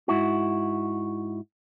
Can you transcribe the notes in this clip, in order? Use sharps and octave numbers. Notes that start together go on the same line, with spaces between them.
G#2 E4 F#4